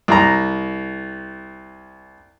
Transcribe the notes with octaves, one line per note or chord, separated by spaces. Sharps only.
C2 A#5